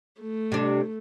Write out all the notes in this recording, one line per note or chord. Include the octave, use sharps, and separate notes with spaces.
A3
C3 D4